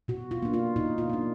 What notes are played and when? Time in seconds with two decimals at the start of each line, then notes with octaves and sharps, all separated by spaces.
0.08 B2 F#4
0.31 F4
0.42 A#3 D4
0.54 F4
0.76 B2 D#4
0.98 F4
1.10 A#3 D4